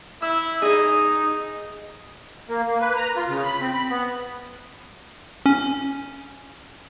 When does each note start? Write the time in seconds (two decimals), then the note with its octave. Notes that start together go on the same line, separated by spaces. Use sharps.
0.22 E4 E6
0.62 D#4 G#4 D#5
2.49 A#3
2.68 A#3
2.80 B4
2.96 A#5
3.16 F4
3.29 C#3
3.44 B5
3.61 C4
3.74 B5
3.90 B3
5.46 C#4